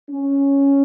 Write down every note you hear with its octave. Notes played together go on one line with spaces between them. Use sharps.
C#4